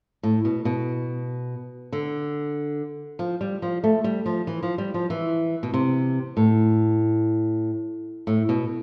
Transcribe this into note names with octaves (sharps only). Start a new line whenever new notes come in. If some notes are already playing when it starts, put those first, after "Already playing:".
A2
B2
B2
D3
F3
G3
F3
A3
G3
F3
E3
F3
G3
F3
E3
B2
C3
A2
A2
B2